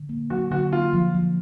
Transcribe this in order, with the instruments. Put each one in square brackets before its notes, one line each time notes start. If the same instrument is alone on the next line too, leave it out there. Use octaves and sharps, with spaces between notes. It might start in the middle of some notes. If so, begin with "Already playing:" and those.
Already playing: [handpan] D3
A#3
[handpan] F#3 [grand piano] F#4
[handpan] D3 [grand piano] F#4
[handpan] A#3 [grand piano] F4
[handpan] F3
F3